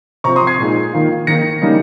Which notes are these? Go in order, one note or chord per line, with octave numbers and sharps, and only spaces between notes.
C3 F3 C4 A#5 C#6
C6 D#6
G#6 C7
A#2 G#3 D#4
D#3 A#3 F4
D#3 A#3 D#4 A#6 C#7
C#3 G3 A#3 D#4